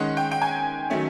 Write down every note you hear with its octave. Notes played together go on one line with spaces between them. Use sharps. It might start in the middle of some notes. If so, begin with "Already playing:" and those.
Already playing: D#3 G#3 C#4 F#5
G5
G5
G#5
D#3 F#3 A3 C#4